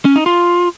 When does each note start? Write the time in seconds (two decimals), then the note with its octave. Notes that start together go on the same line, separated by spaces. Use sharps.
0.05 C#4
0.16 D#4
0.26 F4